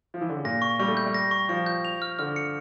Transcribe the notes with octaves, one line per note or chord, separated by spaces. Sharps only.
F3
E3
D3
C#3
A#2 A#6
C#6
G3 C#6
A3
G6
G3
A#6
C#6
F3 C#6
G6
F7
F6
D3 F6
C#7